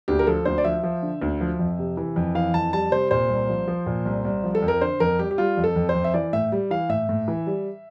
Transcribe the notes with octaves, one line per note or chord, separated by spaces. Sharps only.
D2 G4
A#4
F3 A4
D2 C5
D5
F3 E5
F3
D3
D2
F3
F2
C3
E3
F2
E3 F5
F2 A5
G3 A5
C3 C5
A#2 C5
C2
F3
F3
A#2
C2
C2
F3
A4
F2
A#4
D3 C5
F2 A#4
G3 G4
G4
G3 F4
F2
A4
F2
C5
F2
E5
E3 D5
A2 E5
G3
E3 F5
A2 E5
A2
E3
G3